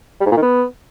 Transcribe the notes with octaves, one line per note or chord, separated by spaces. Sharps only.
G3
G#2
A#2
D#3
B3